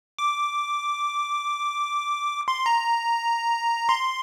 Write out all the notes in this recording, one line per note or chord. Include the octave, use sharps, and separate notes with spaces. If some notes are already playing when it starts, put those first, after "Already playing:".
D6
C6
A#5
C6